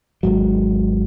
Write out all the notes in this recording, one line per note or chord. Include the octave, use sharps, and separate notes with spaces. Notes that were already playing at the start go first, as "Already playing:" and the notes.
G#1 G#2 F#3